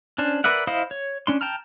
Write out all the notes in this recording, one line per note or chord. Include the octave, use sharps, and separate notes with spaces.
C#4 D4 C5
A#4 B4 D5 E5 F#5
E4 C5 D#5 F5 D#6
C#5
C#4 D4 C6
G5 A5 A#5 F6